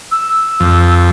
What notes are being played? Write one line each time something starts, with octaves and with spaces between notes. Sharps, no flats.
E6
F2